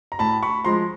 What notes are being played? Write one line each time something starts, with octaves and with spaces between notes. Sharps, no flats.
A#5
A2 A5 B5
B5 C#6
F3 G#3 A#5 C6